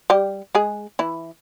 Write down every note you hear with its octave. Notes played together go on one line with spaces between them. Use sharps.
G3 G4
G#3 G#4
E3 E4